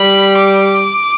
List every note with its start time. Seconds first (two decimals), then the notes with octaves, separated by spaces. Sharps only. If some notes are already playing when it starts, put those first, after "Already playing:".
Already playing: G3 B5
0.37 D6